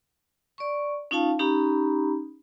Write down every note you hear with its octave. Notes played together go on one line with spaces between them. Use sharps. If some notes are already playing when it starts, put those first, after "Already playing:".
D5 C#6
C#4 D#4 F4 F5 A5
C#4 D#4 G4 A#5 B5